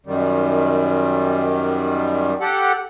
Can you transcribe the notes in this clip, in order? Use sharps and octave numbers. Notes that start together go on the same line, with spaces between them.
F#2 D#3 G3
G4 A4 F#5